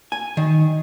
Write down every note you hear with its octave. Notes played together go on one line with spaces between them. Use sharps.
G#5
D#3